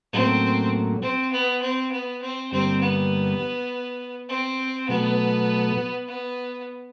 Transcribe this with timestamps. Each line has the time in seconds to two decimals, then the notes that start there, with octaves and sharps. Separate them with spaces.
0.13 A2 F#3 A#3 C4 C#4
1.03 C4
1.32 B3
1.62 C4
1.91 B3
2.22 C4
2.52 G2 D3 G3 A#3 C4
2.81 B3
4.29 C4
4.88 B2 F#3 A3 B3
6.08 B3